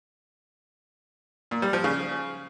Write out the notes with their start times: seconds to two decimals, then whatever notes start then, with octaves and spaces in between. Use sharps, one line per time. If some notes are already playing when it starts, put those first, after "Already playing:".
1.51 A#2
1.62 G3
1.73 F3
1.84 C#3